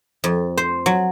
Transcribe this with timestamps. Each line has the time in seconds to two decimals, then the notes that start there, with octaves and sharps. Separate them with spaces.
0.24 F2
0.57 C5
0.86 F#3